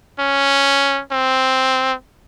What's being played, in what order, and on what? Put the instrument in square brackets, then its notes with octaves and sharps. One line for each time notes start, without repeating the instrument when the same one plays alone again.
[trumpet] C#4
C4